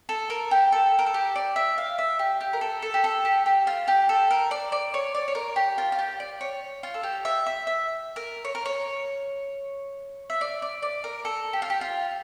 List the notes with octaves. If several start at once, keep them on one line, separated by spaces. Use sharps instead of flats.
A4
A#4
G4
A4
A#4
A4
G4
D5
E5
F5
E5
G4
G4
A#4
A4
A4
G4
A4
G4
G4
F4
G4
A4
A#4
D5
D5
C#5
D5
C#5
A#4
G4
F4
F4
G4
D5
C#5
F4
A4
G4
E5
E5
E5
A#4
C#5
A#4
C#5
E5
D5
D5
D5
A#4
A4
G4
F4
G4
F4